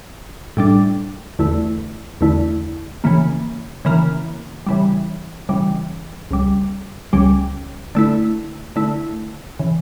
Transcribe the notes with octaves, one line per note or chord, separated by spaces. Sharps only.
A2 G3 D4
E2 D3 A3 E4
E2 D3 A3 E4
C#3 E3 A#3
C#3 E3 A#3
C#3 E3 G3
C#3 E3 G3
C#2 C#3 G3
C#2 C#3 G3
D3 A3 E4
D3 A3 E4
C#3 E3